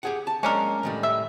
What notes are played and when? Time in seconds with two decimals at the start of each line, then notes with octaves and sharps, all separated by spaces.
0.03 G4 G#4 F#5
0.27 A5
0.43 G#3 A#3 C#4 D4 A#4
0.83 A2 D#3 G3
1.03 E5